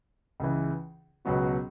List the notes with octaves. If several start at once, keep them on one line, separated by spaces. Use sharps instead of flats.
C#2 C#3 E3
C#2 B2 F#3 B3 F#4